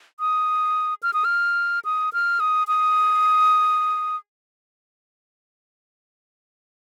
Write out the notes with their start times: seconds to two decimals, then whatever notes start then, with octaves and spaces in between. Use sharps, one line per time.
0.20 D#6
1.03 F6
1.14 D#6
1.25 F6
1.85 D#6
2.13 F6
2.40 D#6
2.68 D#6